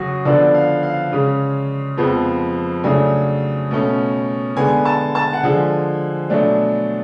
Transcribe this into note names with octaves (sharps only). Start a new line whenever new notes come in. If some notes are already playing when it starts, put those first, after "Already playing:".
Already playing: F#2 C#3 F#3 F#4 G#4
D3 F3 B3 D4 D5
F5
F5
C#3 G#3 C#4
F2 F3 G#3 B3
C#3 F#3 A3 D4 G#5
B2 A3 C#4
D3 G#3 B3 G#5
A5
A5
F#5
D3 F3 G#3 G#5
B2 F#3 A3 D4